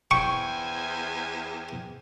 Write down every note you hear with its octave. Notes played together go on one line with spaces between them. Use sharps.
E2 C5 G5 G#5 C#6